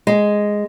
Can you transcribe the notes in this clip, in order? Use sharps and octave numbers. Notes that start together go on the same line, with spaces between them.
G#3